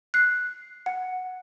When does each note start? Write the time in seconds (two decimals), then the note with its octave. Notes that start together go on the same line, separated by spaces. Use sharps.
0.14 F#6 C7
0.86 F#5